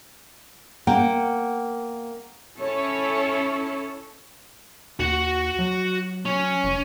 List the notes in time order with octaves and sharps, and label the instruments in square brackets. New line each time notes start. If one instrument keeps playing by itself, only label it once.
[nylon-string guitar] A#3 F#5 G5
[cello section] C#4 E4 A4 C#5
[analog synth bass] D#2 [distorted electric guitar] F#4 F#5
[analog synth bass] F#3
[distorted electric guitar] C#4
[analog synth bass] F1